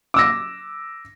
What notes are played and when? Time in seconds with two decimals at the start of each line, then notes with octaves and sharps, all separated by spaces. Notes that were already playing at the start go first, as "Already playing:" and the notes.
0.14 D6 E6 A#6